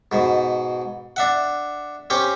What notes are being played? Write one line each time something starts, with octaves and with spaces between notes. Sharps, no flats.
G#2 B2
D4 E5 F#5
C4 C#4 G4 C#5